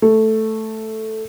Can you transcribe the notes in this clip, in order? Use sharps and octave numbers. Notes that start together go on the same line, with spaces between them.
A3